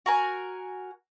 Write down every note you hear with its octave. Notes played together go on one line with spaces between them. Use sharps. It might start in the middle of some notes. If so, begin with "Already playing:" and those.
F#4 A#4 G#5